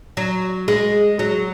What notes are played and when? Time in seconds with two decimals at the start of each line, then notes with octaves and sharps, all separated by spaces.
0.17 F#3
0.68 G#3
1.19 F#3